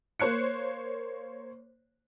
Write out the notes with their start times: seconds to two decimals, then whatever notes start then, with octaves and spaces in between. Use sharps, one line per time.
0.20 A#3 C5 C#5 F#6 C#7